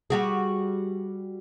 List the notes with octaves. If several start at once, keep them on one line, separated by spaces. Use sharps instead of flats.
G3 F#4 G#4